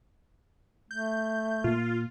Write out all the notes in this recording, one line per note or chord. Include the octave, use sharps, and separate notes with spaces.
A3 G6
A#2 A#3 F4